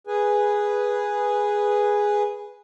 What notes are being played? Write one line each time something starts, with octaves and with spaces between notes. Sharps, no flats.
G#4 B4 G#5